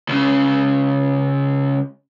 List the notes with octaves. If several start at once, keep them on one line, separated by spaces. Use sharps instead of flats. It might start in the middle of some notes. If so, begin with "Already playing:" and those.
C#2 C#3